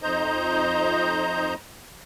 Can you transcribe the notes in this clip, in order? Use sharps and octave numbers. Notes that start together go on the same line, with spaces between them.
F2 D#4 C5 D#5 A#5 G6